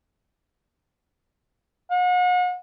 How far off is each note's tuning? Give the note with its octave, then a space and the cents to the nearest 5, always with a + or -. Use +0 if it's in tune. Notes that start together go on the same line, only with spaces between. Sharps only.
F#5 -40